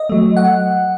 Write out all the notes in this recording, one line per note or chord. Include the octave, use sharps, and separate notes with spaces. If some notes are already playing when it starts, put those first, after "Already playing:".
Already playing: D#5
F#3 A3
F#5